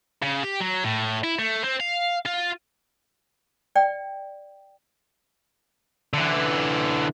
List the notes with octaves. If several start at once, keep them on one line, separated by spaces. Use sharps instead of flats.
C#3
G4
F#3
A2
E4
A3
C4
F5
F4
D5 G5
D3 E3